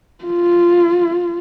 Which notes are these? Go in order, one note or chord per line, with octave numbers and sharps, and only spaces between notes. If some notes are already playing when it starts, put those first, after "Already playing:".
F4